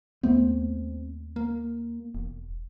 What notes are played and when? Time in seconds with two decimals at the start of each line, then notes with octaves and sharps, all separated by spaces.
0.23 D#2 A3 B3 C4
1.36 A#3
2.15 E1